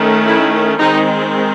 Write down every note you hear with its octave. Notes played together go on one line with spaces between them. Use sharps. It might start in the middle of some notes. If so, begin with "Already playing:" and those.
Already playing: D#3 A3 C#4
E4
D#3 G#3 C4 D#4